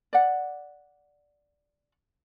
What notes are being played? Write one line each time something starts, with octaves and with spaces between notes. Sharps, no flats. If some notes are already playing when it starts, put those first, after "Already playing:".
D5 F#5